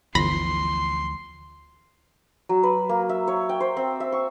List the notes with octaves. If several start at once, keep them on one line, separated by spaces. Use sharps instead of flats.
G1 D2 E3 F3 B5 C6 A#6
F#3
B4
A#3
E5
C#5
G5
C5
C4
E5
C#6